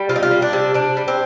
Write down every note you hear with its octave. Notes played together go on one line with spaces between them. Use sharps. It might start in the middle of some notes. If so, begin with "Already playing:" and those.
Already playing: G3
C3 F4
D#4
F4
G3
D4
C3
C3 D4
G3
C4